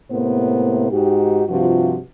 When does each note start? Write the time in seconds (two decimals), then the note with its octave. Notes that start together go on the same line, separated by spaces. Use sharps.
0.11 A2 C3 A#3 B3 C5
0.91 G#2 D#4 F#4 G4
1.49 G2 C3 F3 F4 F#4